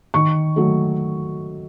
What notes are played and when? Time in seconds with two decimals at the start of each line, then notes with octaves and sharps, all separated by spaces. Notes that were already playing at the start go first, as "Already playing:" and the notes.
0.14 D#3 C#6
0.56 F#3 A3